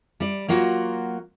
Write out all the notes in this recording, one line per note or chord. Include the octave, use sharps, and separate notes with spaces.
G3 D5
F#3 A#3 F4 F#4